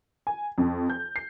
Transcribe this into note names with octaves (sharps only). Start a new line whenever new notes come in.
G#5
F2
G6
C7